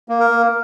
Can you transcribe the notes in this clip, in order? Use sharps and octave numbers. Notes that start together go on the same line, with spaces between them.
A#3
A#4
A#3